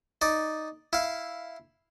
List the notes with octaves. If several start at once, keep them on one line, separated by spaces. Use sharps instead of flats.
D#4 D5
E4 F5